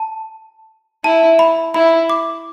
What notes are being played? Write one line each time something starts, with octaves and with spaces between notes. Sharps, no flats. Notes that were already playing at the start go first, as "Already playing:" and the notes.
Already playing: A5
E4 A5
B5
E4 B5
D6